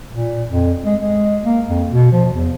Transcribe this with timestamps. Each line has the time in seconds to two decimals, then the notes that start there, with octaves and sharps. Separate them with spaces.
0.12 A#2
0.49 F2
0.85 G#3
1.01 G#3
1.45 A#3
1.68 F2
1.89 B2
2.12 F3
2.33 E2